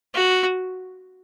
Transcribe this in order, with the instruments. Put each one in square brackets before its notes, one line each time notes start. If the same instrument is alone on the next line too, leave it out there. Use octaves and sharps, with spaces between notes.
[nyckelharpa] F#4